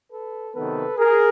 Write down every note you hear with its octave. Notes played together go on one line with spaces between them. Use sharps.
A4 B4
C3 D#3 F#3 B3 A4 B4
G#4 A#4